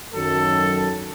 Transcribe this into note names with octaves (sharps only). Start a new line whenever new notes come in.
F#2 D#3 F#3 A4